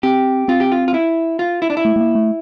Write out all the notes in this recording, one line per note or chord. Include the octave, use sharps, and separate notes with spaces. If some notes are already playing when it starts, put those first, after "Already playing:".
C4 G4
C4 F4
G4
F4
F4
E4
F4
E4
D4
E4
A3
A3
A#3
A3